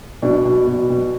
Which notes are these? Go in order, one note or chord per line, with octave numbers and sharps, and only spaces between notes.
B2 D4
B2
B2
B2